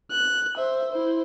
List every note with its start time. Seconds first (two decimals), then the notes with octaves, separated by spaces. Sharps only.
0.12 F#6
0.57 C5 E5
0.92 E4 C5